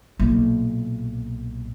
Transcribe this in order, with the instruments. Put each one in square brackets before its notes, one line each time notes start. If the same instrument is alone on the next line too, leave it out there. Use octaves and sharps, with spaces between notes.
[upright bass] B1 A#2